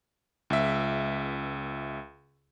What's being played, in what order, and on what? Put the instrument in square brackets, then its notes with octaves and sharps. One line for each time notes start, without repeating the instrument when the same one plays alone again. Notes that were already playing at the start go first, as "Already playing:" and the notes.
[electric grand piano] C#2 E5